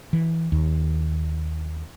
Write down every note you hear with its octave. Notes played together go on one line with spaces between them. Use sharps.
E3
D#2